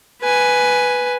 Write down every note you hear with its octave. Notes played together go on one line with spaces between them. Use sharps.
B4 G#5